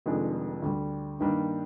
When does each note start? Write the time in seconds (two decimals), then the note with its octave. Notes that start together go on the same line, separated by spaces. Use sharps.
0.06 F1 F2 D#3 G#3 D4
0.62 D2 D3 G3
1.19 G2 D#3 G3 A#3 D4